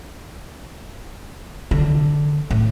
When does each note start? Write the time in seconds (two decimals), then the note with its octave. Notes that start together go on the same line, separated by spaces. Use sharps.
1.71 D3
2.50 A2